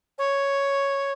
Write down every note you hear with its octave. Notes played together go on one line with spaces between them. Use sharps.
C#5